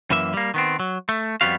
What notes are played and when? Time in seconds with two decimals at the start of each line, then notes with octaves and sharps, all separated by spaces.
0.10 F#2 E3 A#3 E5
0.34 G3 A#3
0.54 D#3 B3 C4
0.80 F#3
1.09 A3
1.41 F2 G3 B3 F#4 F5